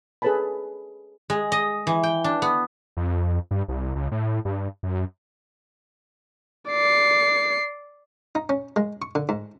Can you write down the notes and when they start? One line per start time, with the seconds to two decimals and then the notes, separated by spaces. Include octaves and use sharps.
0.22 G#4 A4 B4 C#5 A5 B5
1.30 G#3
1.52 D#5
1.87 E3
2.03 G5
2.24 D4
2.42 B3
2.97 F2
3.51 G2
3.68 C2
3.95 C#2
4.12 A2
4.45 G2
4.83 F#2
6.70 D5 C7
8.35 D#4
8.49 C#4
8.76 G#3
9.02 C#6
9.15 D3
9.29 G#2